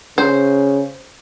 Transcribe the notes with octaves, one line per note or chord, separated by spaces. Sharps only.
C#3 C5